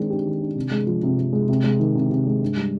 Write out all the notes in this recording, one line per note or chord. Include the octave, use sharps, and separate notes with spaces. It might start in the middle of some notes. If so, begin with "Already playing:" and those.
Already playing: D#3 G#3 C4 D4
G4
D#3
D4
C3
G#3
F3
C3
C3
G#3
C3
G#3
D#3
C3
C3
G#3
G2
G3